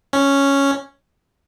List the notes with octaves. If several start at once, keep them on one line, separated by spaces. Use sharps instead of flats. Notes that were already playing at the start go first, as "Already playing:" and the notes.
C#4